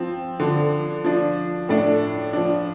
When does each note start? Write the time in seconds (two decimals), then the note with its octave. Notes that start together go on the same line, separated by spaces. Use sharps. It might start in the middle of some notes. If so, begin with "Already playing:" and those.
Already playing: F3 C4
0.40 D3 F3 D4
1.05 F3 D4
1.69 A2 A3 D4
2.33 F3 D4